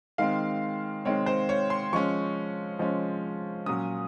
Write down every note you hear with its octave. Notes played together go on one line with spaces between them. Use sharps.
D#3 G#3 C4 F5
D#3 G#3 C4 C#5
C5
C#5
C6
F3 G#3 C#4 C#6
F3 G#3 C#4
A#2 F#3 C#4 D#6